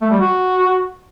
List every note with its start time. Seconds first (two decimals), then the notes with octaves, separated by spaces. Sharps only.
0.01 A3
0.11 G3
0.20 F#4